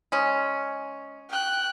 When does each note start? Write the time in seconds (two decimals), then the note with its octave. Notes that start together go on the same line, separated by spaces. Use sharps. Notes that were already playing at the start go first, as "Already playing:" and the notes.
0.12 G#3 C#4
1.29 G5 F#6